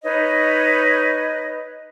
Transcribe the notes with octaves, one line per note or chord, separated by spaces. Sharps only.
D#4 B4 C#5 D#5